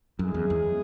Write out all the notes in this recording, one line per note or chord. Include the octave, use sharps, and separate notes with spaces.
F#2 G#3 C#4 E4 G#4
E2
E2